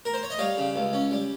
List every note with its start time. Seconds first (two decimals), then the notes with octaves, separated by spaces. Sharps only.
0.05 A#4
0.14 C5
0.23 C#5
0.30 D#5
0.39 G3 C#5 F5
0.58 C#3
0.76 C#2
0.93 C#4
1.11 G3